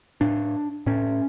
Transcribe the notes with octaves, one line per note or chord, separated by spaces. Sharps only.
A2 D4
A2 C#4